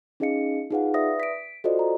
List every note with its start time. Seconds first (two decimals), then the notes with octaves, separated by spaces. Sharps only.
0.20 C#4 D#4 G#4 D#5 F5 C#7
0.71 D#4 F4 G#4 B4 F5 F#5
0.94 B4 D5 E5 D#6 A#6
1.20 B6 D7
1.64 F4 F#4 A4 C5 D5 D#5
1.79 A#5